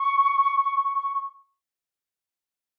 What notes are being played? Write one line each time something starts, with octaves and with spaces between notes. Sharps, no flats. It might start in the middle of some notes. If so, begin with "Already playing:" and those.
Already playing: C#6